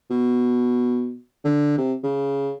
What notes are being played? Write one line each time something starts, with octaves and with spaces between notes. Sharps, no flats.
B2
D3
C3
C#3